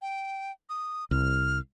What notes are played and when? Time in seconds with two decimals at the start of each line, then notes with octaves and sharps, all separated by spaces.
0.02 G5
0.70 D#6
1.11 C2 F6